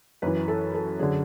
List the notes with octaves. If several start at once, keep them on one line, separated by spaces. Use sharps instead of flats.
F#2 E3 B4
A4
A4
F#2 D3 G#4